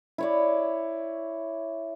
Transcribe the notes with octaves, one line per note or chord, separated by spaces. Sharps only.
E4 C#5 D5